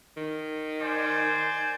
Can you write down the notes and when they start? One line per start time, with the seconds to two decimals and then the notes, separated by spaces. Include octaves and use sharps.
0.17 D#3
0.82 C5 D5 G#5